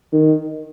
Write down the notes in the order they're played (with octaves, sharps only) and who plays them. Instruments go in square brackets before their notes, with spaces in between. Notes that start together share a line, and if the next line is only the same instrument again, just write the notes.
[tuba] D#3